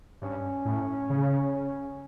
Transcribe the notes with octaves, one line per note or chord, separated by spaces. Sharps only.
G2 C#4
A2
C#3